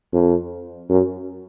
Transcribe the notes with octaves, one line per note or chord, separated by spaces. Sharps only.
F2
F#2